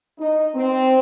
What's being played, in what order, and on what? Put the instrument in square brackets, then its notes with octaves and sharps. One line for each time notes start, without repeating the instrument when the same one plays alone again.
[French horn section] D#4
C4